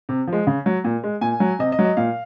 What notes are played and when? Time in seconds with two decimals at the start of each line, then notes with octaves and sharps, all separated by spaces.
0.09 C3
0.27 F3
0.33 G#3
0.47 C#3
0.66 F#3
0.84 A#2
1.04 G#3
1.21 A#2 G#5
1.40 F#3
1.59 C3 D#5
1.72 D#5
1.79 F#3
1.85 D#5
1.97 A#2 F5